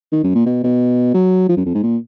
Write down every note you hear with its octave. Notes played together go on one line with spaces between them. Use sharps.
D#3
F#2
A#2
B2
B2
F#3
F3
F#2
F2
G#2
A#2